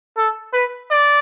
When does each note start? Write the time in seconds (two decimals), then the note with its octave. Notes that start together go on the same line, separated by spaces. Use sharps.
0.17 A4
0.53 B4
0.91 D5